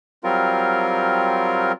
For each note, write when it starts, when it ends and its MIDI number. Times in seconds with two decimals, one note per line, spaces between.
0.24 1.72 54
0.24 1.72 55
0.24 1.72 60
0.24 1.72 65
0.24 1.72 70